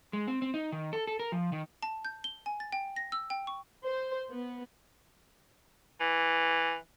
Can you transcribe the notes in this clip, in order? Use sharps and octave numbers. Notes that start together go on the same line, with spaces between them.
G#3
C4
C4
D#4
D#3
A4
A4
A#4
F3
D#3
A5
G6
G7
G#5
A6
G5
A#6
E6
G5
C#6
C5
B3
E3